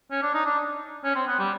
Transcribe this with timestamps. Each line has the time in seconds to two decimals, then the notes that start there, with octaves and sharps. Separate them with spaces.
0.11 C#4
0.22 D4
0.34 D#4
0.45 D4
1.04 C#4
1.15 C4
1.27 B3
1.39 G3